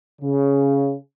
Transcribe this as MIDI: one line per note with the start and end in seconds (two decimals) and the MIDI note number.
0.22 0.93 49